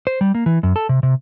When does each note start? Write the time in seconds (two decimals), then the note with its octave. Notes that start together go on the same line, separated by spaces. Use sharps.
0.07 C5
0.21 G3
0.35 A#3
0.46 E3
0.63 F#2
0.76 A4
0.89 C3
1.03 C3